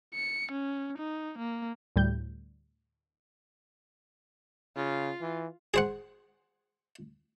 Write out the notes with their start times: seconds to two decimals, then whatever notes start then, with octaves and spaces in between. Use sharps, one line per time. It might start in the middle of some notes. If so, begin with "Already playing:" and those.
0.14 C#7
0.52 C#4
0.98 D#4
1.39 A#3
1.96 D2 A2 G3 G6
4.76 C#3 F4
5.21 E3
5.74 G#4 C5 F#5